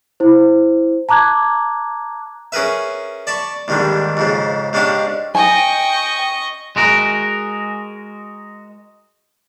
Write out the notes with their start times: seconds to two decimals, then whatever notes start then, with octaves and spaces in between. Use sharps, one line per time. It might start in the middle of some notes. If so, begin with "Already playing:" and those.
0.20 E4 C5
1.09 A5 A#5 D6 F#6 G#6
2.52 C#4 G#4 A#4 B4 E5
3.27 D5 A5 B5 C#6
3.68 D#2 G#2 D3 D#3 G3
4.17 F2 G#2 C#3
4.73 G#2 G#3 C#4 D4 G4 F5
5.35 D#5 G5 G#5 C#6
6.76 G#3 F#4 A#4